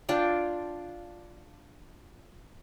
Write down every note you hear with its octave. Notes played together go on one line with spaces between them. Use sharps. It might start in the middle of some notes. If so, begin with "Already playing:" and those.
D4 F4 G5